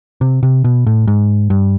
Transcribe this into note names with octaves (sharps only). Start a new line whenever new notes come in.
C3
C3
B2
A2
G#2
G2